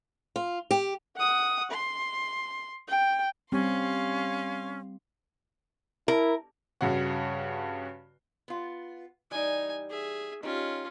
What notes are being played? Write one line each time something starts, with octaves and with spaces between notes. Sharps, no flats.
F4
G4
F#5 D#6
C6
G5
G3 C4 C#4 F5 C6
E4 A#4
G2 C#3 F#4
B3 F4
E3 G3 D#4 D5 G#5
G#4 E5
C#4 D#4 F4 G4